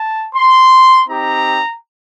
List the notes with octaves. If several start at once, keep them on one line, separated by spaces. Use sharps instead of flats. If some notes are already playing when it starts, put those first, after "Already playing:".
Already playing: A5
C6
C4 D#4 G4 A#5